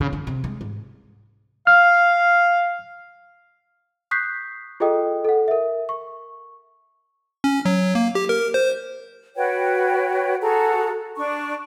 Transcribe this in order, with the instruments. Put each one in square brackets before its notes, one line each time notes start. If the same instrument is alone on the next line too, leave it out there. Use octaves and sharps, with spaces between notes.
[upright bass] C#3
D3
C3
G#3
G#2
[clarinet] F5 [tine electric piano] F6
[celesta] C#6 D#6 F#6 G6 B6 C7
F4 G#4 A4 D#5 G5 D#6
A4 F#5
A#4 E5
C#6
[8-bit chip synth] C#4
F#3
A#3
G4
A#4
C5
[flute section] F#4 B4 C#5 G5
F#4 G#4 A4 A#5
D4 C#6